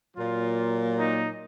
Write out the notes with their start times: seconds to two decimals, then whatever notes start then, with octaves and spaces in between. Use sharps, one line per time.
0.16 A#2 F#3 A#3 F4
0.97 D#4